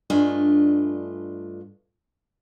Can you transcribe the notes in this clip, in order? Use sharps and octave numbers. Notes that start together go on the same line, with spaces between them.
G2 A3 D4 F4 D#5 G#5